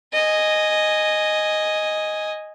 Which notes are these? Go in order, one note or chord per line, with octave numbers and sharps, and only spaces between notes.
D#5 G#5